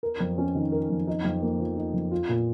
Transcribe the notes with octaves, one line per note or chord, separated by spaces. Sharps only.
A#4
F2
C#4
D#3
A#4
F2
D#4
F2
A#3
F3
D#4
F2
F4
A#2